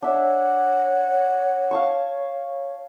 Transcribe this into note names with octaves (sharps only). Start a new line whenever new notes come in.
D4 C#5 E5 F#5
F5 A5 C#6